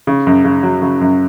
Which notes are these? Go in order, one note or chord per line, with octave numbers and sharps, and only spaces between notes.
C#3
F#2
C#3
F#3
C#3
F#2